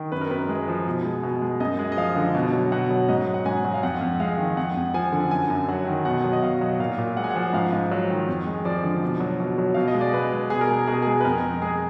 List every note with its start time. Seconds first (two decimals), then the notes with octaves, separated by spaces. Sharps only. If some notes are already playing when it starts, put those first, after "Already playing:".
Already playing: D#3
0.12 F#2 B4
0.21 A#4
0.31 F#2 B4
0.49 G#3
0.68 F3
0.86 B2
1.05 G#3
1.23 B2
1.42 G#3
1.60 F#2 D#5
1.79 G#3
1.92 D#5
1.97 F3 F5
2.16 D3
2.35 B2
2.53 F#3
2.72 B2 F#5
2.90 F#3
3.09 G#2 D#5
3.27 F#3
3.34 F#5
3.46 G#2 G#5
3.65 F#3
3.74 F5
3.83 F2 F#5
4.01 F2
4.20 G#3 F5
4.38 D#3
4.57 F2 F#5
4.76 F2
4.94 F3 G#5
5.12 D3
5.31 F#2 G#5
5.50 F#2
5.68 F#3 F#5
5.87 D#3
6.05 B2 F#5
6.24 F#3
6.33 D#5
6.42 B2 F5
6.61 F#3
6.79 A#2 F5
6.98 A#2
7.17 G#3 F#5
7.24 G#5
7.30 F#5
7.35 F3
7.53 G#2 F5
7.72 G#2
7.91 F#3
8.10 D#3
8.28 F2
8.46 G#3
8.65 F3 D5
8.84 D3
9.02 B2
9.20 F#3
9.40 B2
9.58 F#3
9.74 B2 F5
9.88 D#5
9.94 G#3
10.01 D5
10.14 B2 B4
10.32 G#3
10.50 B2 G#4
10.61 A#4
10.69 G#3 G#4
10.87 B2 G#4
10.95 A#4
11.02 G#4
11.06 G#3
11.20 B4
11.25 F2 A#4
11.43 F2
11.62 G#3 G#4